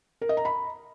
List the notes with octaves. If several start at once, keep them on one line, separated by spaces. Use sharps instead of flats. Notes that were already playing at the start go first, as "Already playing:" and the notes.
A#4
D#5
A#5
B5